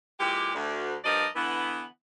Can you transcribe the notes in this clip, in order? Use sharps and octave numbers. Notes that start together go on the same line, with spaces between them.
A#2 E3 G#3 G4
D2
G2 F3 A#4 D5 D#5
D3 E3 B3